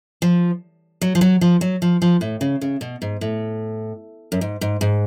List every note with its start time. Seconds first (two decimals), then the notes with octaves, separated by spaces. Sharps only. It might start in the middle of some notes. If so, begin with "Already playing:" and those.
0.22 F3
1.02 F#3
1.15 F3
1.21 F#3
1.41 F3
1.61 F#3
1.82 F3
2.02 F3
2.21 A2
2.41 C#3
2.61 C#3
2.81 B2
3.02 G#2
3.21 A2
4.32 F#2
4.41 G#2
4.61 G#2
4.81 G#2